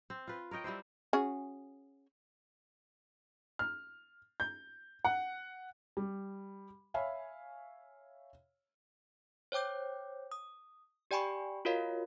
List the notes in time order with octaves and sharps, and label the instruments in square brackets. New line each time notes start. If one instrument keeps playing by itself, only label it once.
[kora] C4
F4 B4
A#4 C#5 D#5 G5
G3 C4 E4 C5
[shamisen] C#4 F#4 G#4
[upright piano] F6
G6
F#5
[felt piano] G3
C#5 E5 F5 G#5 B5
[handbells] C5 C#5 G5 D6 G6
D#6
G4 D5 G5 G#5 B5 C#6
F4 F#4 A#4 C#5 D#5 F5